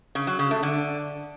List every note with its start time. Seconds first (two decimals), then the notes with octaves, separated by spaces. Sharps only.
0.15 C#3
0.27 F#3
0.39 C#3
0.51 A3
0.63 D3